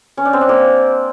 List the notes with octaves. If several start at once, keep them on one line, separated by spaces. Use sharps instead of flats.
C#4
D4
C4
D4
A#3